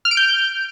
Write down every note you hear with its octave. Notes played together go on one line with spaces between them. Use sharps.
F6
D7
G6